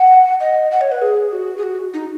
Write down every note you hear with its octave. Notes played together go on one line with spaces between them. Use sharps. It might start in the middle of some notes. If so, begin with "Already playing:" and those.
Already playing: F#5
D#5
F#5
C#5
B4
G#4
F#4
G#4
F#4
D#4